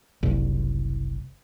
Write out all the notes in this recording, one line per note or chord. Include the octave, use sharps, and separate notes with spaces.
F#1 C2